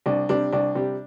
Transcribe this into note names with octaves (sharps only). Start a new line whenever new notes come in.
C2 D4
C3 G3 D4
C2 D4
C3 G3